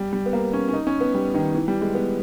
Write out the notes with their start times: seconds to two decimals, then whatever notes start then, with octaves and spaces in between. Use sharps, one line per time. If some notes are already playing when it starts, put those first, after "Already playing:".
Already playing: G3
0.13 G3
0.26 B3
0.33 A#3
0.53 C#4
0.69 C#4
0.73 D#4
0.87 C#4
1.01 B3
1.14 G3
1.34 D#3
1.54 E3
1.68 G3
1.81 G#3
1.94 B3